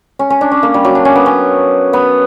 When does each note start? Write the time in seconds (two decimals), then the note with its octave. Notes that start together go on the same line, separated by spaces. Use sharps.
0.19 C#4
0.30 C#4
0.41 D4
0.52 C#4
0.63 A#3
0.74 G3
0.85 F#3
0.95 D4
1.05 C#4
1.16 B3
1.26 C#4
1.93 B3